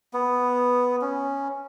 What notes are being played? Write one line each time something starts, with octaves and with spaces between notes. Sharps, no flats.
B3
C#4